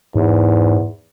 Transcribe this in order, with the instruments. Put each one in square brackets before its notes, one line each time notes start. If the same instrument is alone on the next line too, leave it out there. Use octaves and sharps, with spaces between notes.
[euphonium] E2 [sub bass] G#2